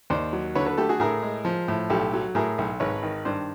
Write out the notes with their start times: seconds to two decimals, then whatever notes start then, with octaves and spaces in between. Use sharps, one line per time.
0.10 D#2 C5 D5
0.33 F#3
0.55 D3 B4 C#5
0.66 A4 B4
0.78 A3 G4 A4
0.89 F#4 G#4
1.00 A2 G#4 A#4
1.23 G#3
1.45 F3
1.68 A2
1.90 B1 G4 A4
2.13 F#3
2.35 A2 G#4 A#4
2.58 B1
2.80 G#1 B4 C#5
3.03 D#3
3.25 G2 C5 D5